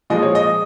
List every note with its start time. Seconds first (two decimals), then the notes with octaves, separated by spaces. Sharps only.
0.10 A#2 F3 G#3 D#5
0.22 C#5
0.35 D#5